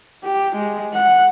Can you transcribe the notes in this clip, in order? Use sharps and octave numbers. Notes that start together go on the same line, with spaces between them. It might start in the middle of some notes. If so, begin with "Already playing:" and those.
G4
G#3
F#5